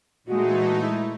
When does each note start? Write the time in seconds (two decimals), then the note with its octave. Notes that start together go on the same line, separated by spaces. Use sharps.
0.27 A#2 E3 G#3 A3 D#4 F#4
0.81 E4